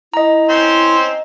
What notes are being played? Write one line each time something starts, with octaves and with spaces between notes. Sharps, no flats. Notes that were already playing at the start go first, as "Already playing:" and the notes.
E4 D#5 A#5
C4 C#4 C5